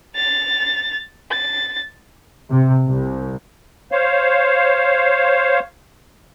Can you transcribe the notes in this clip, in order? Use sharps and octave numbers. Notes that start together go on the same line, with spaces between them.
A6 F7
A6
C3
C2
C5 C#5 F5